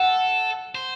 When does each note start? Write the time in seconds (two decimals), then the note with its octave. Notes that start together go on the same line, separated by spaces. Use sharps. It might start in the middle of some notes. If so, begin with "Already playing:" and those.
Already playing: A4 F#5
0.75 C5